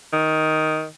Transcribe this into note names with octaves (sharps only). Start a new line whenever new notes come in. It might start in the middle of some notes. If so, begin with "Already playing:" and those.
D#3